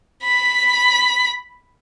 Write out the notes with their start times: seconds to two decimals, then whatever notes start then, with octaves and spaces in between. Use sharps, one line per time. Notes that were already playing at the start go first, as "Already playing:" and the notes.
0.23 B5 B6